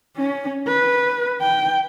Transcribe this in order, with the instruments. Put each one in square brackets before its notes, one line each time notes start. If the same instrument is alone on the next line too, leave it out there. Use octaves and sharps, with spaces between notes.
[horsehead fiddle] C#4
B4
G5